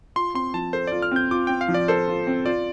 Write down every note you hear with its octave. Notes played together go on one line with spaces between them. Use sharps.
F4 C6
C4 C6
F3 A5
A4 C5
F4 D5
F6
C4 G6
F4 D6
C4 G5
F5
F3
D5
A4 C5
F4
C4
F4 D5